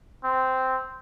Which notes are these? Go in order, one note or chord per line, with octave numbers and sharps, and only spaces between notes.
C4